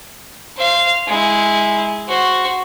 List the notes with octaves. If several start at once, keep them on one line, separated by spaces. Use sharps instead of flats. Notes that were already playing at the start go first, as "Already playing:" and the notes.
C5 F5
G#3 E4
F#4 C5